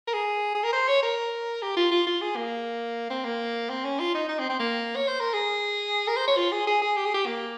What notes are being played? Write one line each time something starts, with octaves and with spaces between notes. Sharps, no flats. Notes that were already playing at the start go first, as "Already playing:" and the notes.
A#4
G#4
G#4
A#4
C5
C#5
A#4
G4
F4
F4
F4
G#4
A#3
C4
A#3
C4
C#4
F4
D#4
D#4
C4
C4
A#3
C#5
C5
A#4
G#4
A#4
C5
C#5
F4
G#4
G#4
G#4
G4
G#4
G4
A#3